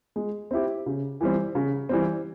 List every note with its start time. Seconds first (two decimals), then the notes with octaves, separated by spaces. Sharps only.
0.16 G#3
0.51 C4 E4 G4
0.86 C#3
1.21 E3 G3 C4
1.55 C#3
1.89 E3 G3 C4